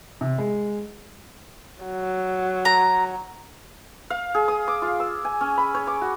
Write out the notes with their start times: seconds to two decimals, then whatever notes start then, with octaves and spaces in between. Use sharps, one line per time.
0.21 C3
0.38 G#3
1.83 F#3
2.65 A#5
4.10 F5
4.35 G#4
4.48 D#6
4.68 D6
4.82 F4
5.00 E6
5.25 G#5
5.41 C#4
5.57 B5
5.75 C#5
5.87 D6
6.01 F#4